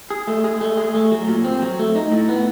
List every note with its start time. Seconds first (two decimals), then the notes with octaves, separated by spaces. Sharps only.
0.10 G#4
0.27 A3
0.44 G#4
0.61 A3
0.77 G#4
0.95 A3
1.12 F#3
1.28 A#2
1.44 C4
1.62 F#3
1.79 A3
1.95 D#4
2.12 A2
2.29 B3